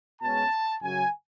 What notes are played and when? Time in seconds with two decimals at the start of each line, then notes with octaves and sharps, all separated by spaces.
0.22 B2 G#3 C#4 A5
0.82 F#2 C#3 F#3 G#5